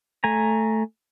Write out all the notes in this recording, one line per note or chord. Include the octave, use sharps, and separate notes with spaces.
A3 G#5 A#5